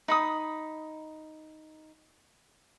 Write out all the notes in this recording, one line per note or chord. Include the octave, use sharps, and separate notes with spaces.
D#4 B5 D#6